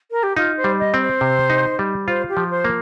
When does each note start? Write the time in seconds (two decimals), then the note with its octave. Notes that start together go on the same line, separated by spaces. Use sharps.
0.11 A#4
0.23 G4
0.37 D#4 F4
0.57 C5
0.64 G3
0.79 D#5
0.94 C4
1.00 C5
1.21 C3
1.50 D#4
1.79 G3
2.07 F4 C5
2.29 G4
2.37 F3
2.51 C5
2.65 A#3